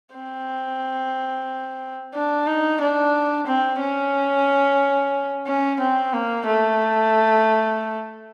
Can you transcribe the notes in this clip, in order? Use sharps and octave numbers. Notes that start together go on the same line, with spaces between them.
C4
D4
D#4
D4
C4
C#4
C#4
C4
A#3
A3